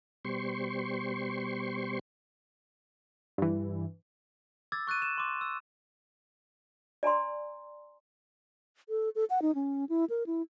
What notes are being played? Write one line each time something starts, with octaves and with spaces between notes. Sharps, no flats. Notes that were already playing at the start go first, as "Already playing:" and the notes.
B2 G3 C5 C6 C#6
G2 E3
D6 E6 G#6 A6
C#6 F#6 A6 D#7
E7
C6 D6
E6
D5 G#5 A#5 C6
A4
A4
F#5
D#4
C#4
E4
A#4
E4